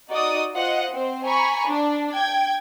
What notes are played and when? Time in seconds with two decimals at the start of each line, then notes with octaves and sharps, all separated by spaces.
0.10 D#4 F#4 D5 D#5 D#6
0.54 F4 C5 D#5 F#5
0.91 C4 C5
1.24 G#5 A#5 B5 C#6
1.68 D4
2.13 G5 G#6